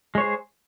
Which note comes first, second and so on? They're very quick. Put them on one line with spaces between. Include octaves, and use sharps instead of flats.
G#3 C#5 C5 G#4